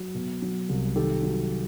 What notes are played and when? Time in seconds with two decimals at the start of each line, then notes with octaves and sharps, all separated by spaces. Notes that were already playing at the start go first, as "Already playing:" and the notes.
Already playing: F#3
0.15 B2
0.42 F#3
0.69 C2
0.95 D#3 G4 A4
1.23 F#3